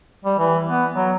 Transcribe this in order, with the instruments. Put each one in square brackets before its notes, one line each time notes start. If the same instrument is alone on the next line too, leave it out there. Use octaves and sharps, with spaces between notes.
[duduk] G3
E3
B3
F#3